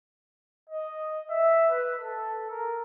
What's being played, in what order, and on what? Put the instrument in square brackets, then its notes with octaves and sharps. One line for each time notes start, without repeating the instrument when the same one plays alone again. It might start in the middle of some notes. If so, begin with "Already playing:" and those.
[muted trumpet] D#5
E5
B4
A4
A#4